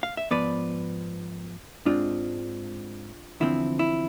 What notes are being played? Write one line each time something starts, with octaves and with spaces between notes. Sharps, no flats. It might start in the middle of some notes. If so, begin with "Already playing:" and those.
F5
E5
G#2 F3 B3 B4 D5
G#2 G#3 C4 D4 F4
E2 D3 F3 A3 C4 E4
E4